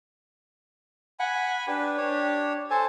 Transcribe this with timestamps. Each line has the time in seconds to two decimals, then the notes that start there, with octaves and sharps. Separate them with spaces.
1.20 F#5 G#5 B5
1.68 D4 G4 B4
1.97 D4 C#5
2.71 A4 C5 G#5 A5